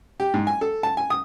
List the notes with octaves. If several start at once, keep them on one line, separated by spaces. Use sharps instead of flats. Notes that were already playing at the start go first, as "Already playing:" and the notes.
G4
G#2
G#5
A4
A5
G#5
D#6